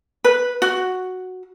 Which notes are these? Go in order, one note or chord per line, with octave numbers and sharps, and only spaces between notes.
B4
F#4